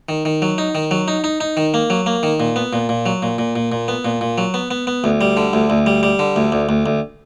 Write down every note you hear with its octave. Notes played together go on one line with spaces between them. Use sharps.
D#3
D#3
F#3
D#4
D#3
F#3
D#4
D#4
D#4
D#3
A#3
F#3
A#3
D#3
A#2
B3
A#2
A#2
F#3
A#2
A#2
A#2
A#2
B3
A#2
A#2
F#3
B3
B3
B3
D2
G3
D3
D2
D2
G3
G3
D3
D2
D2
D2
D2